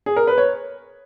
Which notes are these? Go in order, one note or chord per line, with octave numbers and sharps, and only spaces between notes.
G#4
A#4
B4
C#5